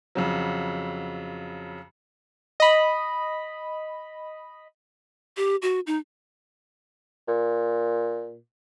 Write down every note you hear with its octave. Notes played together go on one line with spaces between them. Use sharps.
F2 C#3 F#3
D#5 B5
G4
F#4
D#4
A#2